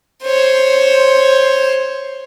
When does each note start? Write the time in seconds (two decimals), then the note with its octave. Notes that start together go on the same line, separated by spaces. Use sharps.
0.23 C5 C#5